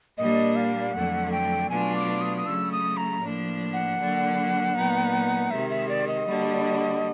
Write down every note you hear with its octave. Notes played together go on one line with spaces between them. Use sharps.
A#2 G3 A#3 D4 D#5
F5
F2 D3 F#3 A3 F#5
G5
B2 F#3 A3 D4 F4 G#5
D6
D#6
D#6
C#3 F#3 A3 E6
D#6
A#5
A2 F3 A#3 D4
F#5
D3 F#3 A#3 D4
A#2 F#3 B3 D#4
C3 D#3 G#3 E5
E5
D5
D#5
D3 G3 A#3 D4 F#4